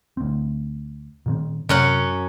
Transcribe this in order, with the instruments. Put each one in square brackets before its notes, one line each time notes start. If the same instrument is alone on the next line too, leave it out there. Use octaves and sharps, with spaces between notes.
[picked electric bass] D2 C4
A#2 D#3 C4
[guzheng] F#2 C#4 F#5 [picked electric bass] C3